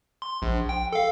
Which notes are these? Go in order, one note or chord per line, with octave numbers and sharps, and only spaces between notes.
C6
A#1
G5
A4 F5